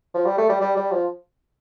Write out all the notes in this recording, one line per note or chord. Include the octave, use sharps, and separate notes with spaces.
F3
G3
A3
G3
G3
G3
F3